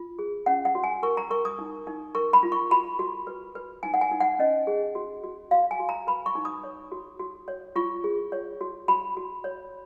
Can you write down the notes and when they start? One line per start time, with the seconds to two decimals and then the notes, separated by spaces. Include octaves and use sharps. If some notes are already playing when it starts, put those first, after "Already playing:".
Already playing: F4
0.19 G#4
0.46 C#4 F#5
0.65 F#5
0.75 F#4
0.84 G#5
1.03 A#4 C#6
1.17 A#5
1.30 A#4 C#6
1.45 D#6
1.59 D#4
1.87 D#4
2.15 A#4 C#6
2.33 B5
2.43 F4
2.52 C#6
2.71 F#4 B5
2.99 F#4
3.27 B4
3.55 B4
3.83 D#4 G#5
3.94 F#5
4.01 G#5
4.11 D#4
4.20 F#5
4.39 C#4 D#5
4.67 G#4
4.95 F#4
5.23 F#4
5.51 F#4 F5
5.71 G#5
5.80 F#4
5.89 A#5
6.07 B4 B5
6.26 C#6
6.35 D#4
6.45 D#6
6.64 C#5
6.92 F#4
7.19 F#4
7.48 C#5
7.76 F4 C#6
8.04 G#4
8.32 C#5
8.61 F#4
8.88 F#4 B5
9.17 F#4
9.44 C#5